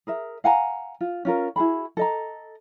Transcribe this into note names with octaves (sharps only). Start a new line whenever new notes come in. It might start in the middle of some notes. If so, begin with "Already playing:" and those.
G#4 A#4 E5
F5 F#5 G#5 A#5
F4
C#4 F4 A#4
E4 F#4 G#4 B5
A4 D#5 A#5